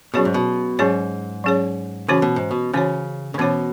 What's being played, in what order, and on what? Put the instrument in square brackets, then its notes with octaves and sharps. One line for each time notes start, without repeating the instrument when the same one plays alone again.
[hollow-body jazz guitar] B2 [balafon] F#3 C#4 G#4 C#5
[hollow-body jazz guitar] G#2
B2
[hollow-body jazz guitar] G#2 [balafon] F#3 C#4 G#4 C#5
[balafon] F#3 C#4 G#4 C#5
[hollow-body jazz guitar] C#3 [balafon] E3 C#4 F#4 C#5
[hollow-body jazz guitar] B2
G#2
B2
[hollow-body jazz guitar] C#3 [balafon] E3 C#4 F#4 C#5
[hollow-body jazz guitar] C#3
[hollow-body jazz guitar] B2 [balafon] E3 C#4 F#4 C#5